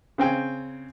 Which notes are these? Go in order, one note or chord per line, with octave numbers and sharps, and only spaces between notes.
C#3 C4 G5 G#5